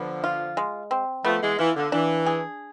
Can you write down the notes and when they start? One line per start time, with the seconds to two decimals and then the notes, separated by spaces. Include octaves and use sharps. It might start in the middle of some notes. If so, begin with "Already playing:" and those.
Already playing: D3 F3 B3
0.24 F4
0.57 G#3
0.91 C4
1.24 F3 A3 B3
1.41 E3 G#3
1.58 E3 F4
1.76 D3
1.92 E3 D4
2.26 G#4